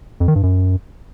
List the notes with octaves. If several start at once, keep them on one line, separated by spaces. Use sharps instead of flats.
F2
D#3
G2
F#2